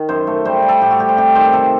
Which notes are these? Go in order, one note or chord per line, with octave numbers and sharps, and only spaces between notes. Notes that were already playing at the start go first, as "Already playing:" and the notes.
Already playing: D#3
F#2 C5
A3
G3 C5
G3
A4
A2 G4
F#4
G3 G4
C5
C3 G4
D#3 C5
C3 A4